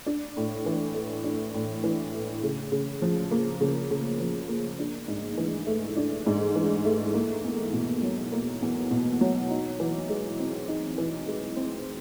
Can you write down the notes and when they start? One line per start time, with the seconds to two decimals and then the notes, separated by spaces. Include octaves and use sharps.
0.06 D4
0.37 A2
0.66 E3
0.94 A3
1.24 D4
1.54 A2
1.84 E3
2.13 A3
2.43 C#3
2.72 C#3
3.02 F3
3.31 A#3
3.60 C#3
3.90 C#3
4.20 F3
4.49 A#3
4.79 D4
5.08 G#2
5.37 E3
5.67 A3
5.97 D4
6.26 G#2
6.55 E3
6.85 A3
7.14 A#3
7.44 E2
7.73 B2
8.03 F#3
8.32 A#3
8.62 E2
8.91 B2
9.21 F#3
9.51 D#4
9.80 E3
10.09 G#3
10.39 C4
10.68 D#4
10.98 E3
11.27 G#3
11.56 C4